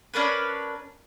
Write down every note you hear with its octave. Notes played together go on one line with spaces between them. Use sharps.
C#4 D4 A#4 B4